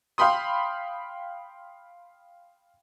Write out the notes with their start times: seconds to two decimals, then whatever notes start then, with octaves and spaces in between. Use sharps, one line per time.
0.18 F5 G5 B5 C6 D#6